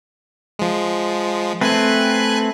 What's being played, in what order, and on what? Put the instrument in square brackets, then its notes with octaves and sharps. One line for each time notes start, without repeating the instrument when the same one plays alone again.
[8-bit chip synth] F3 G#3
[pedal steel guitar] A3 C4 [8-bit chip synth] B4 G#5 F#6